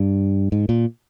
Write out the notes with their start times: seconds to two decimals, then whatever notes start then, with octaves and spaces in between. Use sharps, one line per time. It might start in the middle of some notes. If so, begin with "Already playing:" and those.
Already playing: G2
0.52 G#2
0.69 A#2